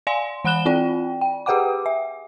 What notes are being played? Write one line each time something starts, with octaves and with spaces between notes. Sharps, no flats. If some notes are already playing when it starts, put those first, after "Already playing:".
D5 F5 G#5 C6
E3 F#5 B5 F#6 E7 G7
C4 F4 D5 G5
G5
G4 G#4 B4 F#5 G5 D6
E5